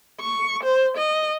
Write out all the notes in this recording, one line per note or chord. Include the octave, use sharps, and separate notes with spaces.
C#6
C5
D#5